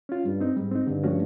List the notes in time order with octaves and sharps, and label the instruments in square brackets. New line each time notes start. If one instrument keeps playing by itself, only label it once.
[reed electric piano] C#4 F4
[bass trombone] G2 [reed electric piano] G3
[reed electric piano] C4 D#4
[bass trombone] G#2 [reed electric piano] G3
[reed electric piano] C4 D#4
[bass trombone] G2 [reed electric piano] D3
[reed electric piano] F3 A3 C#4 F#4